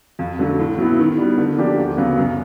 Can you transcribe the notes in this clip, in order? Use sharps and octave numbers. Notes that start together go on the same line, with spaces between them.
F2
D3 F#3 A3
A2
F#3 B3 E4
D#3
G3 B3
D3
F3 A#3 D4 G4
D2
C#3 F#3 B3
F#2